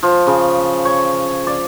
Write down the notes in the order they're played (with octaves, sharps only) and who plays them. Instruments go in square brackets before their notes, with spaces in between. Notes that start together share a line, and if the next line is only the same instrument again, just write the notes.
[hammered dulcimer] F3
C#3
C#5
D5